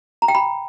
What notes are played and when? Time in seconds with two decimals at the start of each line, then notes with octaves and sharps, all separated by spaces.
0.22 A#5
0.28 G5
0.35 B5